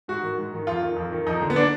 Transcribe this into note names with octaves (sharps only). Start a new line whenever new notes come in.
G#2 F#4
D#3
G#2
D#3
F2 F4
D#3
F2
D#3
F2 D#4
D3
B3
D4